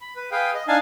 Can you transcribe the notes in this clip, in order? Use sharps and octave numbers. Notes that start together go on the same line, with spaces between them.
B5
B4
G#4 B4 F5 G5
D#5
D4 D#4 F5 G#5 A5